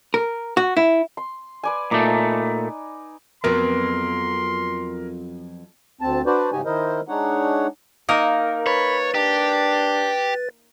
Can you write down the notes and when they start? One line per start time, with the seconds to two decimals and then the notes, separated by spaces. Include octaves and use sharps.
0.14 A#4
0.57 F#4
0.77 E4
1.17 C6
1.63 B4 D5 G#5
1.91 A#2 A3 D#4 D5
3.44 F2 F#3 B3 A#4 C6
6.01 D2 C4 A5
6.26 D4 F#4 B4 C5 D5
6.52 G#2 C#3 D#4 F#4 G4 G#5
6.65 D#3 E4 A#4 C5 D#5
7.08 G#3 D4 D#4 C#5 F#5
8.09 A#3 D#4 A#4
8.66 B4 C#5 B5 A6
9.15 D4 G4